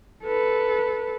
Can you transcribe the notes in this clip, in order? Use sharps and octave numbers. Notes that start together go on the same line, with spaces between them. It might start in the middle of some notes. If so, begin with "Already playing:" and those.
A4 B4